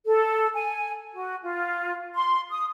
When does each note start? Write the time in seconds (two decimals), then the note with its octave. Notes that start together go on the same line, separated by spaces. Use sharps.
0.06 A4
0.54 G#5
1.13 F#4
1.42 F4
2.14 C6
2.50 D#6